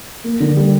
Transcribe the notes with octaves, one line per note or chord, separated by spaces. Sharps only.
A#3
D3
G3